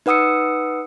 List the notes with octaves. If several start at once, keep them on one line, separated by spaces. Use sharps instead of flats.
D#4 B4 F#5 D#6 E6 C#7